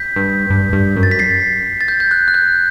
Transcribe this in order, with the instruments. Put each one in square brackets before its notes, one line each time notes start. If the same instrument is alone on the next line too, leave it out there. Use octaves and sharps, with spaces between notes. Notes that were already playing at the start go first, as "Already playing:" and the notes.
Already playing: [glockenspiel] G6 B6
[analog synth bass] G2
G2
G2
F#2
[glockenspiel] A6
B6
A6 C7
A6
G6
G6
F#6
F#6
G6